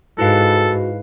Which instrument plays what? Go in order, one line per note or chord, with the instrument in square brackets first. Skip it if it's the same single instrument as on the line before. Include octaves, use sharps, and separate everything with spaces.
[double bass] G#2 [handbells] E4 B4 F5 [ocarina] F#4 [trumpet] A4